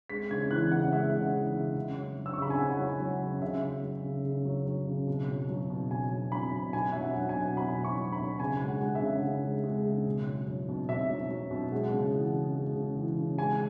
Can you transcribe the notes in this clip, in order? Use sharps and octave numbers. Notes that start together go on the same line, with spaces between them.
G#3 B6
C#3 G#6
E3 F#6
C#3 F#5
G#3 E5
C#3
E3
C#3
C#3
F#3
F#3
E6
C#6
C#3 B5
G#5
C#3 F#5
F#3
F#3
C#3
C#3 E5
F#3
F#3
C#3
C#3
F#3
F#3
C#3
B2
F#3
F#3
B2
B2 G#5
F#3
F#3 B5
B2
B2 G#5
F#3 E5
F#5
F#3
G#5
B2
B2 B5
F#3
C#6
F#3
B5
B2
C#3 G#5
G#3
F#5
G#3
E5
C#3
C#3
G#3
G#3
C#3
B2
F#3
F#3
B2
B2 E5
F#3
F#3
B2
G#3 F#5
C#3
E3
C#3
G#3
C#3
E3
C#3
G#3 G#5